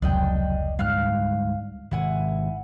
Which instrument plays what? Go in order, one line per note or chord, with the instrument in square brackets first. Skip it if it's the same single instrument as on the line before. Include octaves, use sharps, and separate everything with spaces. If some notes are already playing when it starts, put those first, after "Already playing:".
[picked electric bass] F1 C#2 [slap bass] F#3 [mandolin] D4 D#5 G5
[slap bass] D2 G#2 G3 [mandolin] F5 F6 F#6
[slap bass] G#1 C3 [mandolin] E4 F#5 G#5